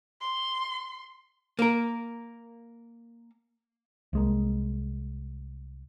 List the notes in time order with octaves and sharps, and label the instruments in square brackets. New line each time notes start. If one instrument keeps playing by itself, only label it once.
[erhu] C6
[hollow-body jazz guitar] A#3 A#4
[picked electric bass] C2 G#3 A#3